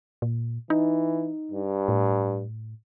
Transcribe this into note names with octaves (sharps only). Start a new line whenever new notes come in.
A#2
E3 D#4
G2
A2